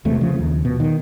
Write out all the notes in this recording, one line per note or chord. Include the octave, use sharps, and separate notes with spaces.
E1 E2 C3 A3
C#3 F3
D#2
B2
D#3